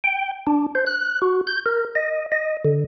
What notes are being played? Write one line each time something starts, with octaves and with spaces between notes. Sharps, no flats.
G5
D4
C5
F#6
F#4
G6
A#4
D#5
D#5
D3